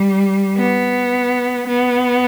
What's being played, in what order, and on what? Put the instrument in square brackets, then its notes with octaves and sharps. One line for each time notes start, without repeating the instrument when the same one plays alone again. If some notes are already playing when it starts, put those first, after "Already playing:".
Already playing: [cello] G3
B3
B3